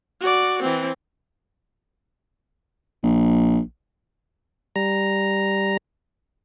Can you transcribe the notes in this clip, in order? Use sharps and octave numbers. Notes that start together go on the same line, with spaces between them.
F#4 D5
E3 C4
A#1
G3 A#5